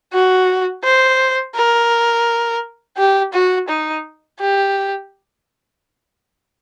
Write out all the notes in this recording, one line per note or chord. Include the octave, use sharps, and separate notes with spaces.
F#4
C5
A#4
G4
F#4
D#4
G4